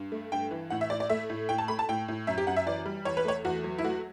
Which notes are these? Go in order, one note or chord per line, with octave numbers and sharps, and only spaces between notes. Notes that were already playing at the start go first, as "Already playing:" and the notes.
Already playing: G2
A3
G2 G5
E3
A2 F#5
E5
A2 D5
D5
A3 E5
A2
A2 G5
A5
A3 B5
A5
A2 G5
A2
F#2 E5
G4
F#2 F#5
E5
E3 D5
G3
E2 C#5
B4
A3 C#5
E2 F#4
F#3
E4
A3 F#4